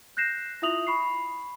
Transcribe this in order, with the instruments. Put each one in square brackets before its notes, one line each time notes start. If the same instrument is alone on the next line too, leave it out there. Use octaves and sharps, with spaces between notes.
[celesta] F#6 G6 A#6 C7 E7
E4 F4 E5 D#6 F7 F#7
B5 C#6 C7